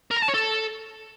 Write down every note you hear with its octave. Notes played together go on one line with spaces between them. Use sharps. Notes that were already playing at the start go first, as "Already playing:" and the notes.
A#4
A#5
A5
C#5
A4